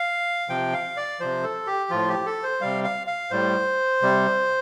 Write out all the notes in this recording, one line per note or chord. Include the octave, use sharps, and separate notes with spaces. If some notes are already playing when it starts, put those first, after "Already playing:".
Already playing: F5
C3 F3 G5
F5
D5
C3 F3 C5
A4
G4
A2 F3 F4
G4
A4
C5
C3 G3 F5
F5
F5
A2 G3 C5
C3 G3